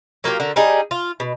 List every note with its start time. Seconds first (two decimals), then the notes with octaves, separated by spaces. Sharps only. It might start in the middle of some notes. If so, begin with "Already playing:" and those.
0.24 F#3 A#3 F4 G4
0.40 D3 F#4 A#4
0.56 G3 D#4 G#4
0.91 F4
1.20 B2